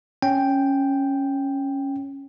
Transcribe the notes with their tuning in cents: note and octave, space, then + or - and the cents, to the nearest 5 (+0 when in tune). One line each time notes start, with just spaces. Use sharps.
C#4 -5 G5 +0